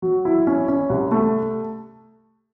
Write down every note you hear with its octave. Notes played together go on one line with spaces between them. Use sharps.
F#3
E4
C#4
C#4
C2
A3